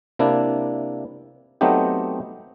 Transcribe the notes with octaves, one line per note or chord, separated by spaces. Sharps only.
C3 A#3 D4 E4
F#3 A3 B3 C4 D#4 G4